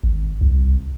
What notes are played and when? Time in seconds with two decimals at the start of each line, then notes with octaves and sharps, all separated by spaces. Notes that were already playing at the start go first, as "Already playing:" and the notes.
0.03 G#1
0.41 C2